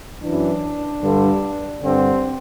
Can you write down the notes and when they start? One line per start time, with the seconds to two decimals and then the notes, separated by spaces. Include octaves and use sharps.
0.23 F#2 E3 D4
1.02 G2 D3
1.83 G2 D3 C4